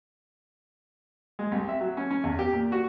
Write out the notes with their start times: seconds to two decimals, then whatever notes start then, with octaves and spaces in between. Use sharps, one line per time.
1.39 G#3
1.52 C2
1.69 E5
1.81 F#3
1.97 C#4
2.11 C#4
2.24 E2
2.39 G4
2.53 A#2
2.72 F#4